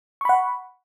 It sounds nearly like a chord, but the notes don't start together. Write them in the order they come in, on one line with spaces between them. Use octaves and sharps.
C#6 B5 F#5